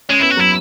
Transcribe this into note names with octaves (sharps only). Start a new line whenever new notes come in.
G#3 C#4
B3 E4
F#4
F#3 E4